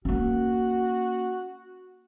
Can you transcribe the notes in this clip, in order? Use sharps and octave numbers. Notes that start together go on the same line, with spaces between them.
A#3 C#4 F#4